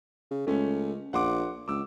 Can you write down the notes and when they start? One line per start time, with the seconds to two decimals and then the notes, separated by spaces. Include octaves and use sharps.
0.31 C#3
0.47 C#2 A3 C#4
1.13 A#1 F#5 C6 D6
1.68 C#2 D6 E6